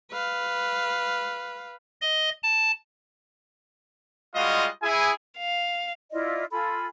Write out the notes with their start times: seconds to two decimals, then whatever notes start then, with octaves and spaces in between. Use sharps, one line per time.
0.11 B4 F5
2.02 D#5
2.43 A5
4.35 G3 G#3 F4 F#4 D#5 F5
4.83 E4 G#4 G#5
5.38 F5
6.12 E4 F4 D5 D#5
6.52 F4 A4 G#5 B5